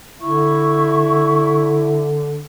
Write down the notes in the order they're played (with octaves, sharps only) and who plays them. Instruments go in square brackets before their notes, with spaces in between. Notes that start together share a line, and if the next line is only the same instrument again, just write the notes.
[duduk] D3 [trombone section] E4 [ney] C#6